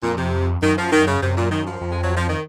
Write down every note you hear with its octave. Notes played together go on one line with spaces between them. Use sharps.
F2 A#2
C3
F#2 D#3
F3
D#3
C#3
F#2 C3
A#2
D#3
F3
F2
G#3
F#3
F3
D#3